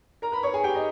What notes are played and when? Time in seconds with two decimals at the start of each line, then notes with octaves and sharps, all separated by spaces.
0.22 A#4 A#5
0.32 B4 B5
0.43 C#5 C#6
0.53 G#4 G#5
0.63 G4 G5
0.74 D#4 D#5